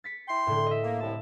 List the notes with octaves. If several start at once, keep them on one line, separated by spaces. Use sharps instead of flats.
A6 B6 C#7
E4 G5 C6
A2 D3
D#5 E5
A#3
C2 A2 A5